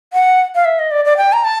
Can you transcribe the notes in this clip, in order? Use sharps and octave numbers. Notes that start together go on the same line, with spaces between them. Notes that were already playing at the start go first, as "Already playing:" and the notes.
F#5
F5
E5
D#5
D5
D5
G5
A#5
A5